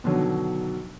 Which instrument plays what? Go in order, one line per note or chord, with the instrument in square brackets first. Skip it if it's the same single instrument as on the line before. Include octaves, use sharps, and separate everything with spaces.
[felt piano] B2 D3 D#3 F#3